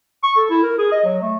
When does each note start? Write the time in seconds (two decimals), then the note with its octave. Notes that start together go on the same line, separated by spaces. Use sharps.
0.23 C#6
0.37 A4
0.50 E4
0.63 A#4
0.78 G#4
0.92 D#5
1.05 F#3
1.22 A3